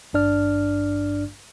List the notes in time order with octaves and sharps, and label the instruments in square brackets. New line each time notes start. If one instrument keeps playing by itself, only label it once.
[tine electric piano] G#1 G2 D4 D5 F6